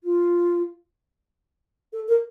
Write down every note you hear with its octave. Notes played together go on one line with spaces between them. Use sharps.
F4
A4
A#4